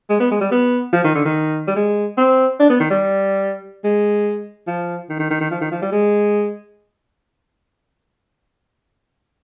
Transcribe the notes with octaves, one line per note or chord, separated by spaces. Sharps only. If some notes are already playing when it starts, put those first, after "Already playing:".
G#3
B3
G#3
G3
B3
F3
D#3
D3
D#3
G3
G#3
C4
D4
B3
D#3
G3
G#3
F3
D#3
D#3
D#3
D#3
F3
D#3
F3
G3
G#3